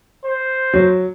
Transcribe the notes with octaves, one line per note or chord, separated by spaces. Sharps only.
C5
F#3